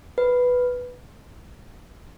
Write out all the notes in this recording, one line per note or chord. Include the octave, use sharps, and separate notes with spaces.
B4